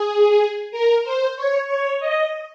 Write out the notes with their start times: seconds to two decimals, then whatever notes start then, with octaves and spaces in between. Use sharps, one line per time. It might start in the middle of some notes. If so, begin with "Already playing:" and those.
Already playing: G#4
0.71 A#4
1.04 C5
1.36 C#5
1.67 C#5
2.00 D#5